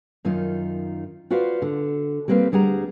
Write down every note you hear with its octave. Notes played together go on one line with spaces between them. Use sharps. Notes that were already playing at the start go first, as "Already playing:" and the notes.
F#2 D#3 D#4 F4
F4 F#4 B4 C5 D5 F5
D3
G3 A#3 C4 B4 F5
D2 G3 G#4 F#5 A#5